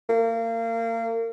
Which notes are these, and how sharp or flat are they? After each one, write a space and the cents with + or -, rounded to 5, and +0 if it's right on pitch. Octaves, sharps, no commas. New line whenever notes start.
A#3 -30